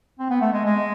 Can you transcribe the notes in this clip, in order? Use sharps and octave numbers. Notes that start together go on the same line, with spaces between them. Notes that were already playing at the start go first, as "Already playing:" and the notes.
C4
B3
A3
G#3
G#3